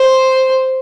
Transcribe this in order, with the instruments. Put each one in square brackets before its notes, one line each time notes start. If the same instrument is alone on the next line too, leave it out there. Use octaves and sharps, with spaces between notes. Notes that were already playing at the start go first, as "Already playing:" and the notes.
Already playing: [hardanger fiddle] C5